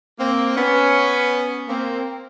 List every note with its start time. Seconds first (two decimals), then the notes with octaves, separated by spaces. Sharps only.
0.18 A#3 C4
0.55 B3 C#4
1.67 A#3 C4